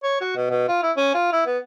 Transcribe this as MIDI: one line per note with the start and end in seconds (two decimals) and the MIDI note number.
0.03 0.21 73
0.21 0.32 66
0.36 0.46 47
0.50 0.66 47
0.68 0.81 65
0.83 0.92 64
0.97 1.11 61
1.14 1.29 65
1.33 1.42 64
1.46 1.58 59